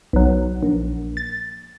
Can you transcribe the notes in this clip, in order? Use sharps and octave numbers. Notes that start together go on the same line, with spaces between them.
B1 F#3
A#1
A6